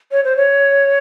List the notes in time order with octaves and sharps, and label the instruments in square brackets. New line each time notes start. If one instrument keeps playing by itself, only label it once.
[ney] C#5
C5
C#5